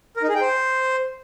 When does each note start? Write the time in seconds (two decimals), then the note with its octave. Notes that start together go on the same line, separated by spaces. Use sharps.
0.17 A#4
0.23 D#4
0.29 G#4
0.35 G5
0.41 C5